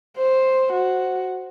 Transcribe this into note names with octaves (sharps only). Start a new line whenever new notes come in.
C5
F#4